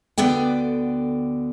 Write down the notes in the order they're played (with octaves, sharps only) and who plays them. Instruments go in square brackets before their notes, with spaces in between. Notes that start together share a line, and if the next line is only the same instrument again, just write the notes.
[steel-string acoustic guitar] D2 D3 B3 D5 G5